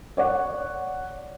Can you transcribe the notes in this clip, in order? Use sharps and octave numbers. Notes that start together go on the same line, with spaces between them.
C#5 D5 F#5